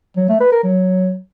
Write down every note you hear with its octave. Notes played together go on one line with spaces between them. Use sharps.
F#3
A3
B4
A#4
F#3